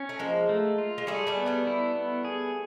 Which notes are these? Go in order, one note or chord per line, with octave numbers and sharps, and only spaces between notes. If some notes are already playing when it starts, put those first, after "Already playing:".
Already playing: C#4
A3
F3 G#3 A#3
A3
F4
G#3
G3 A3 G#4
G3 A3
B3
G3 A3
E4
B3
G#4